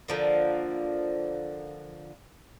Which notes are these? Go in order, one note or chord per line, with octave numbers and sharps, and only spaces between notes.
D3 F3 A#3